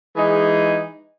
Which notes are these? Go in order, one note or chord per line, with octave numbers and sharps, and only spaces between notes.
E3 G#3 D#4 G#4